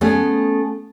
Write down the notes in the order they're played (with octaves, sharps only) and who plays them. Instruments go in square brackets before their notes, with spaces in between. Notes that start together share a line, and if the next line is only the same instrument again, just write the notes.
[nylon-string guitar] A3 B3 C#4 G#4